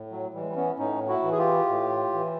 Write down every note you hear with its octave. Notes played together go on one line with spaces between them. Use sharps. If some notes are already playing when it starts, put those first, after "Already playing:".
Already playing: A2
F#3
E3 G3
G#3
G3
B3 C#4
A2 C#4 D#4
E4 F#4
E3
G#4
F4 G4
A2
E3